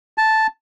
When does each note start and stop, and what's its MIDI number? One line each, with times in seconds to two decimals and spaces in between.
0.18 0.47 81